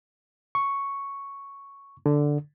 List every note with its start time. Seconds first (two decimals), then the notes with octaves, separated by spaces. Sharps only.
0.55 C#6
2.06 D3